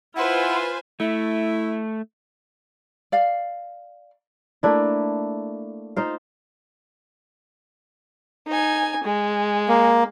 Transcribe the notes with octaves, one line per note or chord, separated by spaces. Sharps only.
E4 F4 B4 C5 F#5 G#5
A3 E4
D5 F5
A3 A#3 D4 E4
D#4 F4 C5 F5
D#4 G#5
G#3
A#3